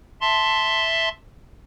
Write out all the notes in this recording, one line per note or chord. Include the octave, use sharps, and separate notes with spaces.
E5 A5 C6